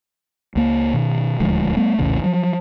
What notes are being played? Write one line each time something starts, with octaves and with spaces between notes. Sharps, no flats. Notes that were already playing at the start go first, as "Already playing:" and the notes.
C#2 A#3
B2 D#3
D#1 D2 F3 G#3
G3 A3 B3
A#1 E2 A2 C#3
F3 F#3